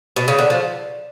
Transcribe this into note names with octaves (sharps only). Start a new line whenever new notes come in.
B2
C#3
D3
F3